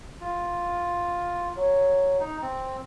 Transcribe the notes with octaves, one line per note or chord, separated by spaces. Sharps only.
F4
F#3
D#4
C4